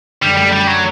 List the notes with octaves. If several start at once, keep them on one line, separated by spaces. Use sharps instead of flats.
F#2 D3 G3 A3 D4
G3
G3
F#3